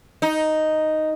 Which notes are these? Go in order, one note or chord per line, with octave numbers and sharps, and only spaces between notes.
D#4